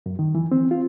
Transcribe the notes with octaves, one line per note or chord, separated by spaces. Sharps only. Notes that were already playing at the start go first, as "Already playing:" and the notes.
F#2
D#3
E3
C4
F4